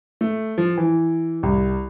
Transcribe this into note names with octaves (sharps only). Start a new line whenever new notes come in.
A3
F3
E3
C2